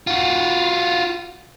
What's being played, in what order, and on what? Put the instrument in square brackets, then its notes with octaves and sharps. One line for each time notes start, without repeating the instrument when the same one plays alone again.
[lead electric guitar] F4 F#4